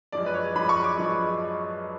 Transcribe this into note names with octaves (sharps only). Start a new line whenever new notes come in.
F#2 F3 G#3 D5
B4
C#5
F#2 F3 G#3 B5
C#6
D6
F#2 F3 G#3